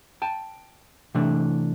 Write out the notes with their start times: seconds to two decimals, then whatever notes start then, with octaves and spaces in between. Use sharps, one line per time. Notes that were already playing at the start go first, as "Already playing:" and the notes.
0.22 G5 A5
1.15 C3 E3 A3 D4